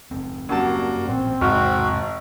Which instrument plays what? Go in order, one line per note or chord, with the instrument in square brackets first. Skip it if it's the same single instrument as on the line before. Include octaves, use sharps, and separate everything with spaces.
[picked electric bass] F#1 C4
[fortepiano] F#2 A5 [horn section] G3 A#3 F#4
[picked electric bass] A1 A#2 [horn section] C4
[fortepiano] G#1 F6 [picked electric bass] E2 G#2 C3 [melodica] F#4